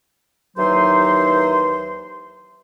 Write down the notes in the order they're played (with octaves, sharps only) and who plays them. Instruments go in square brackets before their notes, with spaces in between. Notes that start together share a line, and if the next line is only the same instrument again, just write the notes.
[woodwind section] D#2 E3 F#3 D#4 C5 C6